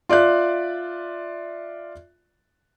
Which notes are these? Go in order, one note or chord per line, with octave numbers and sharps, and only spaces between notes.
F4 D5 E5 F#6